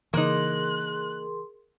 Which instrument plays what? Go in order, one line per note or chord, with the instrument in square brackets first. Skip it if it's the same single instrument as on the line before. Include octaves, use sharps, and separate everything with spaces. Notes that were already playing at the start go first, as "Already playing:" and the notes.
[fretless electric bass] C#3 E3 [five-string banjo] A#3 D#4 [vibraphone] G#4 A#4 C6 [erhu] F#6